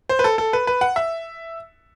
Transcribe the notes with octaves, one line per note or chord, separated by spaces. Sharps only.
C5
B4
A4
A4
B4
B4
F#5
E5